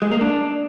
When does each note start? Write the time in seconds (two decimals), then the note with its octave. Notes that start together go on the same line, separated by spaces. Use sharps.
0.02 G#3
0.11 A#3
0.21 D4